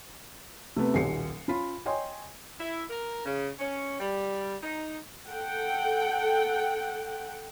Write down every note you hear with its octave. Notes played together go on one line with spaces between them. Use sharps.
C3 A3 B3
D#1 B1 G4 C7 C#7
C#4 F4 B5
C#5 D#5 G5 G#5 C6
E4
A#4
C#3
C#4
G3
D#4
A4 F#5 G5